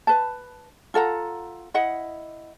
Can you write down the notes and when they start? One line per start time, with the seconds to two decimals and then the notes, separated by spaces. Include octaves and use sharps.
0.07 B4 A5
0.94 F4 A4 F#5 A#5
1.74 E4 D#5 F#5